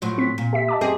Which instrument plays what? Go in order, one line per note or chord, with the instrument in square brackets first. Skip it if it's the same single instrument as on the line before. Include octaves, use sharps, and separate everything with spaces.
[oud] A2 F3 F#3
[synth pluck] C4 B6
[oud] A#2
[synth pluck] G4 E5 B6
D#5 A5 D6
[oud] F#2 C4 G#4 [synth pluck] G4